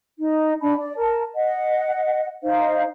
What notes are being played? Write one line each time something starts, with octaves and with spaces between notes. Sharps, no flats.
D#4
D4 A5 B5
D5
A#4 A5
D#5 F#5
D#4 C5 F5